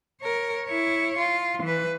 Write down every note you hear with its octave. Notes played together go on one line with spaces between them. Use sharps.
A#4 C#5
E4 C#5
F4
E3 B4